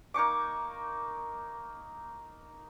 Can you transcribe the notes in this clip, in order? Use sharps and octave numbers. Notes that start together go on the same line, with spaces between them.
A#3 D#4 C#6 D6